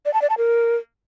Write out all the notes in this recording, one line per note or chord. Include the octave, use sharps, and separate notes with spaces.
D5
A5
D5
A5
A#4